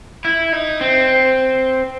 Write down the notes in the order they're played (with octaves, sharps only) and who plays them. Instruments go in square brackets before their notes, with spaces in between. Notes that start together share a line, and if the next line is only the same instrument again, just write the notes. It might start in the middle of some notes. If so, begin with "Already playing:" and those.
[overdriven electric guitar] E4
D#4
C4